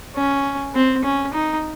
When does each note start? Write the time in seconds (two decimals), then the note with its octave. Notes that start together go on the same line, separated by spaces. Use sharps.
0.16 C#4
0.75 C4
1.04 C#4
1.34 D#4